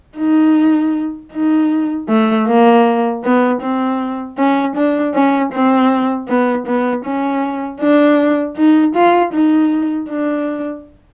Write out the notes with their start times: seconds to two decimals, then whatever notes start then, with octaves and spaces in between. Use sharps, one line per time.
0.18 D#4
1.33 D#4
2.09 A3
2.47 A#3
3.24 B3
3.61 C4
4.37 C#4
4.76 D4
5.14 C#4
5.53 C4
6.28 B3
6.66 B3
7.05 C#4
7.80 D4
8.57 D#4
8.95 F4
9.33 D#4
10.09 D4